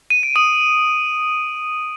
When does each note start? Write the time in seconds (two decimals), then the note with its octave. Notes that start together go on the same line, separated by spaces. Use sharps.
0.10 D#7
0.23 D7
0.36 D#6 D#7